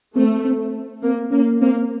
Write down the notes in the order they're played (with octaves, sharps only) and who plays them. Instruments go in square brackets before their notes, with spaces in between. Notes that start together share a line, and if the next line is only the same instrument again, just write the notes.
[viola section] A3 [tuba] C4
[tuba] C4
[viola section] A#3 [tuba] C4
[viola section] A#3 [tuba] C#4
[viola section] A#3 [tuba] C4